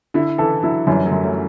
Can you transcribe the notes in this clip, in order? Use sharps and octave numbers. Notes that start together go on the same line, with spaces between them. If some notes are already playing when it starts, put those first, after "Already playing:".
D3 E4
C#3 E3 A4
D3 F#3 E4
F#2 E3 G3
F#3 A3
F#2
A3 C#4